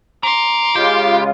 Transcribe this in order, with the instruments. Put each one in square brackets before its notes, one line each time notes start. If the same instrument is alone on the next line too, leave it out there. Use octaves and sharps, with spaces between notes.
[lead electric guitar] A#5 [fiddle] C6 D6
[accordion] C#3 G#3 F4 [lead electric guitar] G4